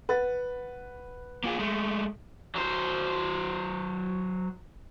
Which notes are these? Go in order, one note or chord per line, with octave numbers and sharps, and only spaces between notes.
B4 F#5 A6
A#3 F4 G#4
G#3 A3
F#3 C5